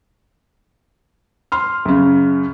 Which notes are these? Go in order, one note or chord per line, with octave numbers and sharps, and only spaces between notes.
C6 F6
F#2 C#3